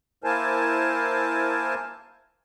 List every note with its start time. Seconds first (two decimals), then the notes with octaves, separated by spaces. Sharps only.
0.24 A#3 E4 A#4 C5 G#5 A5